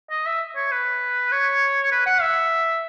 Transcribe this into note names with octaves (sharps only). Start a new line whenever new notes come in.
D#5
E5
C#5
B4
C#5
B4
F#5
E5